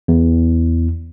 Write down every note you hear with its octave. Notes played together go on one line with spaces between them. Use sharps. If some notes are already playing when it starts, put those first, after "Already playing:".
E2